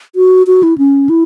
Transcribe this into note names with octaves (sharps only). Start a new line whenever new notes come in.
F#4
F#4
E4
C#4
E4